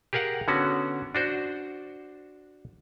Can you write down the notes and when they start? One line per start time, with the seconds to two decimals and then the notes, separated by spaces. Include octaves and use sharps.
0.13 G4 G#4 A#4 F5 F#5
0.48 D3 B3 C#4 F#4
1.15 D4 F#4 C5